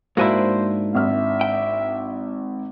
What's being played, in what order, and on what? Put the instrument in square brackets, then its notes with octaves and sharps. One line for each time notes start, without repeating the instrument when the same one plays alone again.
[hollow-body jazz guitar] G#2 F#4 G#5 [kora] A#3 D4 E4 [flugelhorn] C5
[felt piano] G#1 F6 [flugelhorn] E5
[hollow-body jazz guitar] G5